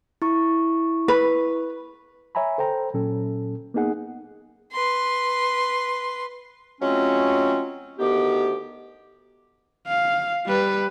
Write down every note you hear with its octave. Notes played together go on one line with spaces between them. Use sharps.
E4 C#6
B4
C#5 E5 G#5 A#5 B5
A4 C5 G5 A#5
A#2 F#3 C#4 A4
A#3 B3 D#4 G#4 F#5
B4 C6
F#3 G#3 A3 C4 C#4 F4
D2 D#3 B3 G4
F5
G3 B4